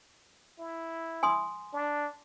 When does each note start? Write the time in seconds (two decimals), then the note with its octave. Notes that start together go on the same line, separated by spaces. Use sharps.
0.59 E4
1.23 G#5 C6 D#6
1.73 D4